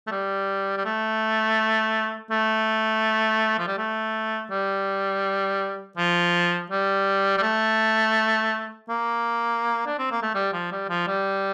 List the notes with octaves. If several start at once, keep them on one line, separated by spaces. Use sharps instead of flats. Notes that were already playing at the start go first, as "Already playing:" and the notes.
A3
G3
G3
A3
A3
F3
G3
A3
G3
F3
G3
G3
A3
A#3
D4
C4
A#3
A3
G3
F3
G3
F3
G3